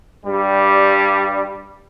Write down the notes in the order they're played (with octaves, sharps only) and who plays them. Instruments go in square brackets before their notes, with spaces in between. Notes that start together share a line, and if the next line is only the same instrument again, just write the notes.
[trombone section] G2 G3